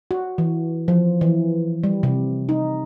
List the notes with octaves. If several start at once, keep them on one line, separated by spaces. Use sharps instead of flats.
F#4
E3
F3
E3
G3
C3
D#4